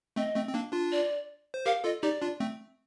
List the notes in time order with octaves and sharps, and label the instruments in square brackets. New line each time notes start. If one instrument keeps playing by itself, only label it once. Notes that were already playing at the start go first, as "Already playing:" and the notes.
[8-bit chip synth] A3 C4 [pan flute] D#5
[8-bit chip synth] A3 C4
C4
A#3 D4
D4 F4
[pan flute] D5
[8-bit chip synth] C5
[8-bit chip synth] G4 A#4 [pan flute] F5
[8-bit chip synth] F4 A4 [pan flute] D#5
[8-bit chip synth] D#4 G4 [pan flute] D5
[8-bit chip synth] D4 F4
A3 C4